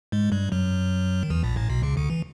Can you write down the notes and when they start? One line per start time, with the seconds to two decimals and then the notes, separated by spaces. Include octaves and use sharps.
0.12 G#2 G#3
0.32 G2 G3
0.52 F#2 F#3
1.23 D#3
1.30 E2 E3
1.43 A#1 A#2
1.56 A1 A2
1.69 B1 B2
1.83 C#2 C#3
1.97 D2 D3
2.10 E3